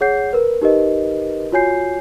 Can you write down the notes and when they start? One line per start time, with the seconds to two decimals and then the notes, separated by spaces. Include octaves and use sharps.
0.01 G#4 C#5 F#5 G6 C7
0.33 A#4 B4
0.62 D#4 G4 A#4 B4 D#5
1.52 F4 F#4 C#5 G#5 G6 C7